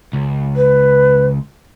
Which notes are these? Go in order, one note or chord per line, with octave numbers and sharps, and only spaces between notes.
C#2
B4